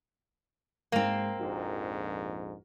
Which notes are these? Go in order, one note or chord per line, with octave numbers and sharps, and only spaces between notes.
G#2 G#3 A#3 C4
A#1 F2 G#2 F#4 A#4